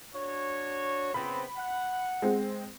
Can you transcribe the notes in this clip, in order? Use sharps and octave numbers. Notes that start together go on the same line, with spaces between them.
D4 F#4 C#5
C#3 B3 C4 B5
F#5
G#3 C4